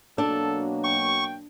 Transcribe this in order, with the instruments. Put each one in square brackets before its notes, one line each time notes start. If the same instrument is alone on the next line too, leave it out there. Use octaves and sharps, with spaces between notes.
[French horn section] B2 F#3 A#3 [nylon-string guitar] D4 [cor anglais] A4
[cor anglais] G5 [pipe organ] C#6